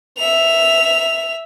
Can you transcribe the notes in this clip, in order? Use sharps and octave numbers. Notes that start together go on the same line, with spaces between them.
E5 F7